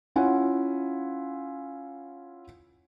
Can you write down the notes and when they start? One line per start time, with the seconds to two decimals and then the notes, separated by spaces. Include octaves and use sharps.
0.16 C#4 E4 F4 F#5 G#5